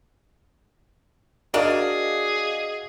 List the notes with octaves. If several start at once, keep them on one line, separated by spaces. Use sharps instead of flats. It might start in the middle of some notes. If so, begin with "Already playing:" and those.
D4 F#4 G#4 A#4 D5 D#5 F5